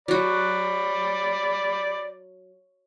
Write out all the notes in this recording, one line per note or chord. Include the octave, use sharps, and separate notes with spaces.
F#3 F#4 D5 B5